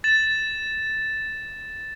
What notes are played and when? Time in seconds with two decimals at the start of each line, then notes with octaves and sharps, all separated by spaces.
0.04 A6 E7